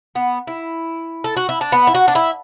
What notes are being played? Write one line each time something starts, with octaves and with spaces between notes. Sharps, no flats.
B3
E4
A4
F#4
E4
D4
B3
E4
F#4
D4
E4